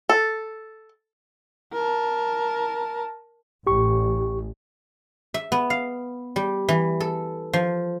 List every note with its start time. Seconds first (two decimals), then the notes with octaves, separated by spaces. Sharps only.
0.09 A4
1.73 A#4 A5
3.67 A1 G4 C#6
5.34 E5
5.52 B3
5.70 F5
6.36 G3
6.68 E3
7.00 A4
7.53 F3